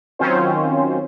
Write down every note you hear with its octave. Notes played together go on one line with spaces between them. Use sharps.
D#3 F#3 C4 C#4 F4 C5